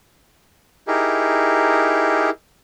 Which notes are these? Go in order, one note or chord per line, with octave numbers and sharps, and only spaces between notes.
D#4 E4 G4 G#4 A#4